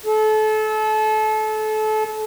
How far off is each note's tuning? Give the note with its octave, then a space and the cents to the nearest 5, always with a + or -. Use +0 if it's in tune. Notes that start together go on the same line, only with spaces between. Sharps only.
A4 -30